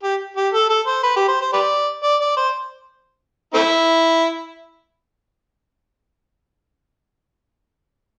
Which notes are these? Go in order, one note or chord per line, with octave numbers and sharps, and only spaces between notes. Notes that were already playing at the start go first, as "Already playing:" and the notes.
G4
G4
A4
A4
C5
B4
G4
C5
C5
G4 B4 D5
D5
D5
C5
A3 C4 E4